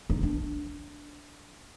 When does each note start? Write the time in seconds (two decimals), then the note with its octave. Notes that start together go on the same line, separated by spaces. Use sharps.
0.10 D#4
0.23 D4